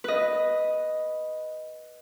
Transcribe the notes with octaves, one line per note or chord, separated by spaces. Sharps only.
B4 D#5